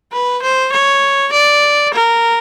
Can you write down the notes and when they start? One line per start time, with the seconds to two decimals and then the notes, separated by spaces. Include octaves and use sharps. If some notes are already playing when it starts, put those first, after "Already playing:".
0.12 B4
0.42 C5
0.73 C#5
1.33 D5
1.94 A#4